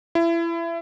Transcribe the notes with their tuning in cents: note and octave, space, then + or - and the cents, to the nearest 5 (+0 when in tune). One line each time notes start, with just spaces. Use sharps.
E4 +30